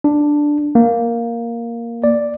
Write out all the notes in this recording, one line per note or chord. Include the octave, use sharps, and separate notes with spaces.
D4
A#3
D5